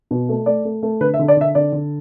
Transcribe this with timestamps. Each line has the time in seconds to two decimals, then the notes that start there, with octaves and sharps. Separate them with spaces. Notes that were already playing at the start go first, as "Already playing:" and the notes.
0.11 B2
0.29 A3
0.46 A3 D5
0.65 A3
0.83 A3
1.01 D3 B4
1.14 E5
1.19 D3
1.28 D5
1.37 D3 E5
1.55 D3 D5
1.72 D3